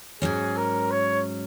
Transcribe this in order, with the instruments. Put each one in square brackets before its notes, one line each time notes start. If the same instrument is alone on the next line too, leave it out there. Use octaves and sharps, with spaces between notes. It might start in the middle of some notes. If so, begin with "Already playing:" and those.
[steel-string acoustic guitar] G#2 F#3 C#4 [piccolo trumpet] G#4
[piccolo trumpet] A#4
C#5